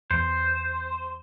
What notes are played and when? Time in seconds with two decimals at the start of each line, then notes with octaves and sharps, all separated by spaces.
0.11 E2 C5